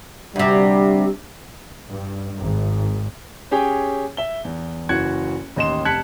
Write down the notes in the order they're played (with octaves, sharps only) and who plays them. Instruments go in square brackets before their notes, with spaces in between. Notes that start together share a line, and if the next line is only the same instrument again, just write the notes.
[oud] D2 C3 [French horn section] G3
[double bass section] G2
G#1
[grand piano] C#4 G4 G#4 C#5 G5 G#5
E5 G7
E2
F#1 E3 F#4 F#6 G#6 C#7
A1 D#2 D#5 C6 E7
F1 A5 F#6 G#6 B6 C#7